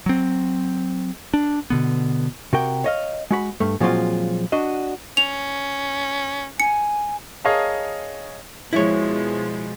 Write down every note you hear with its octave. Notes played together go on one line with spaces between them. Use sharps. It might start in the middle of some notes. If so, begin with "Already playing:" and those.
F#3 C4
D4
B2 D3 B3
C3 F#4 A#4 G5
C#5 D#5 F5
G#3 F#4 B5
G2 A3
A#2 F3 F#3 G#3 C4 F4
D4 F#4 D#5
C#4 F7
G#5 C#7
G#4 A#4 C#5 D#5 F5 A5
B2 F3 G#3 E4 C#5